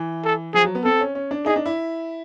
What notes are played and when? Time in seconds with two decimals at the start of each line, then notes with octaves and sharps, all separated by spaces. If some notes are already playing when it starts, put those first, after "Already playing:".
Already playing: E3
0.25 A4
0.54 F3 G#4
0.64 F#3
0.75 B3
0.85 C4 A4
1.01 C#4
1.15 C#4
1.31 D4
1.46 D#4 G#4
1.56 D4
1.66 E4